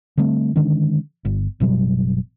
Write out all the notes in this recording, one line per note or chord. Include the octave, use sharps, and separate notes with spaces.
D3 G3 A3 C4
D3 D#3 G#3 C#4
G1
F#1 B2 F#3 G3